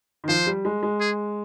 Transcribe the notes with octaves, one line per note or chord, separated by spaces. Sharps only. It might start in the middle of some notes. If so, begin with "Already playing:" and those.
D#3
F3 C5
G3
G#3
G#3
G#4